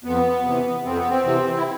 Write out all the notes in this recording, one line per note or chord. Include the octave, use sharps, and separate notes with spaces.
F2 B3
C3 E3
F2 C4
B3
C4
C3 E3
E4